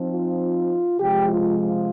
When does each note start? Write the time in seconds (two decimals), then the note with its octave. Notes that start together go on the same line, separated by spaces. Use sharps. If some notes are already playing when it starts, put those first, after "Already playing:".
Already playing: F3 C4 D#4
0.12 F4
1.00 C3 F3 G#3 G4
1.29 F4
1.59 F4